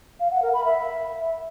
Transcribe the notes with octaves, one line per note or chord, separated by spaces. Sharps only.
F5
F#5
A#4
B5
E5